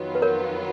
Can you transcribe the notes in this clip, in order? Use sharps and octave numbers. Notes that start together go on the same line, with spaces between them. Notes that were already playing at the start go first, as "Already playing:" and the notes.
Already playing: F2 D#3 F#3 B3 F4
B4
A#4 C#5